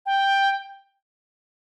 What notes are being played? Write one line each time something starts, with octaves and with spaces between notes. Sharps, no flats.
G5